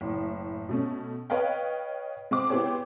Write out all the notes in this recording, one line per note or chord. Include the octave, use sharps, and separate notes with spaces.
F#1 A2
B2 A3 C#4
B4 C#5 D#5 F5 G5
G#3 C4 D6
B3 E4 G4 G#4 C5 C#5